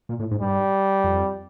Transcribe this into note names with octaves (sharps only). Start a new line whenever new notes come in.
A#2
A2
G#2
G2 G3
F2